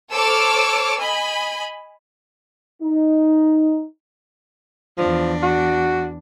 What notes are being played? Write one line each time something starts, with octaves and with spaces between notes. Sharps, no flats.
A4 C5 C#5 D6 E6 F6
D#5 G#5 B5
D#4
E2 F3 D4
F#4